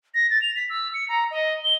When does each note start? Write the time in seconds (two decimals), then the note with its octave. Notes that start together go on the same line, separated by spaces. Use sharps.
0.14 A#6
0.30 A6
0.42 F7
0.56 B6
0.70 E6
0.94 C#7
1.09 A#5
1.31 D#5
1.64 G7